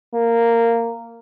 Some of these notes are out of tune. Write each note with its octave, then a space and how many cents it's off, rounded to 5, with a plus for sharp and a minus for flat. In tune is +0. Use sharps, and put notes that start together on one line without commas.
A#3 -10